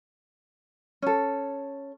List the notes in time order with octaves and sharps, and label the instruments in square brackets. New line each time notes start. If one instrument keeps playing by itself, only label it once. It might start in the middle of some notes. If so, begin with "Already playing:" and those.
[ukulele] C#4 A4